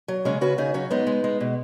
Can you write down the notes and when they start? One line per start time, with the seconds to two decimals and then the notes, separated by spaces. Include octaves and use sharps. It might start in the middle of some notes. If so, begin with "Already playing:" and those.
0.08 F#3
0.25 C#3 G#3 C#4
0.41 C#3 F#4 B4
0.58 C#3 D#4 G#4
0.74 F#3 C#4 F#4
0.91 G#3 B3 D#4
1.07 G#3
1.24 G#3
1.41 B2